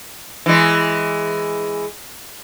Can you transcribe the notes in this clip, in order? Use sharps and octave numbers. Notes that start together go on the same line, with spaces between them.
E3 G#3